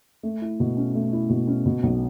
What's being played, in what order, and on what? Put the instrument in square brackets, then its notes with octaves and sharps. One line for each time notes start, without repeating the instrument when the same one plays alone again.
[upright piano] A3
E4
B2
C#4
A3
E4
B2
C#4
B2
B1